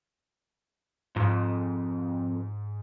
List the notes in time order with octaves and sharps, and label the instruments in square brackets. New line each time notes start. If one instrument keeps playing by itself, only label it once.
[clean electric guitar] F2 [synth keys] G#2